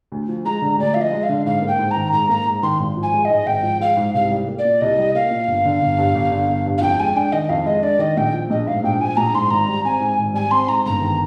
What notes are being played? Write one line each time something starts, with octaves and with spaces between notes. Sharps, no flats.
D2
F3
G#3 A#5
D3
D2 D5
F3 F5
D#5
G#3
F5
D3
G#2 F5
A#3
G5
G#2
A#5
D#3
G#2 A#5
A#3 A#5
G#2
D#3 C6
G#1
F3
G#5
G#3
D#5
G#2
G#1 G5
F3
G#3 F5
G#2
C2 F5
G3
A#3
D5
A#2
C2 D#5
G3
A#3 F5
A#2
G1
D3
G1
G2
G1
D3
G1
G2
F5
F2 G5
G#3 G#5
D4 G5
D#3 D#5
F2 F5
G#3 D#5
D4 D5
D#3 D#5
A#1 G5
F3
A#1 D#5
G#2 F5
A#1 G5
F3 G#5
A#1 A#5
G#2 C6
G#1 A#5
G3
C4 G#5
G#2
G#1
G3 G#5
C4 C6
G#2 A#5
G1 A#5
D#3